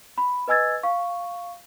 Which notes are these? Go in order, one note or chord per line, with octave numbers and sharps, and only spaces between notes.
B5
B4 D#5 G#5 E6 G#6 A6
F5 C#6